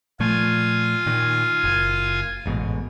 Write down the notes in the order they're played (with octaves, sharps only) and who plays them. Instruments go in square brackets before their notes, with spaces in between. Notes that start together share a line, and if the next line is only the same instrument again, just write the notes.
[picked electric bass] A#2 F3 A3 [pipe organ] F4 G#5
[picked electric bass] A#2 D#3
F#1
A1 G#2 B2